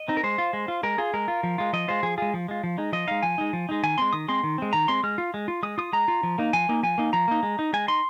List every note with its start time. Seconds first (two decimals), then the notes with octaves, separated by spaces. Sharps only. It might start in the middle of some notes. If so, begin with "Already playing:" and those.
Already playing: D#5
0.08 C4 D#4
0.17 A#4
0.23 G#3 C5
0.38 F4
0.53 G#3
0.68 F4
0.83 G#3 A#4
0.98 F4 G#4
1.14 G#3 A#4
1.28 F4
1.43 F3
1.58 G#3 F4
1.73 F3 D#5
1.88 G#3 F4 C5
2.03 F3 G#4
2.18 G#3 F4 G#4
2.34 F3
2.48 G#3 F4
2.64 F3
2.78 G#3 D#4
2.93 F3 D#5
3.07 G#3 D#4 F5
3.23 F3 G#5
3.38 G#3 D#4
3.53 F3
3.69 G#3 D#4
3.83 D#3 G#5
3.98 G#3 C4 C6
4.13 D#3 D#6
4.28 G#3 C4 C6
4.43 D#3
4.58 G#3 C4
4.73 D#3 A#5
4.88 G#3 C4 C6
5.03 G#3 F6
5.18 F4
5.34 G#3
5.48 F4
5.63 G#3 D#6
5.78 F4 D#6
5.93 G#3 A#5
6.08 F4
6.23 F3
6.38 A#3 D#4
6.53 F3 G#5
6.69 A#3 D#4
6.83 F3 G#5
6.98 A#3 D#4
7.13 F3 A#5
7.28 A#3 D#4
7.43 G#3
7.59 D#4
7.73 G#3 G#5
7.88 D#4 C6